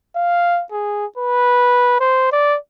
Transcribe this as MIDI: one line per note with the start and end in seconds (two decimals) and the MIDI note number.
0.16 0.63 77
0.71 1.06 68
1.18 1.99 71
2.00 2.29 72
2.32 2.57 74